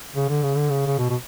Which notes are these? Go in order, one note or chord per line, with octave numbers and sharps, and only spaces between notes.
C#3
D3
C#3
D3
C#3
C#3
B2
B2